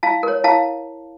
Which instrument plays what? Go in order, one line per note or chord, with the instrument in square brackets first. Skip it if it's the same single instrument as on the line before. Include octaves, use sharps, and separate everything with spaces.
[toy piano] E4 F5 A5
A#4 C#5
E4 F5 A5